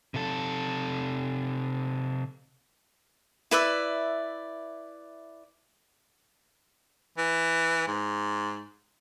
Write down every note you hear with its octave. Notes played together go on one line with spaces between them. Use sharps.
C3 A4
E4 B4 D5 E5
E3
G#2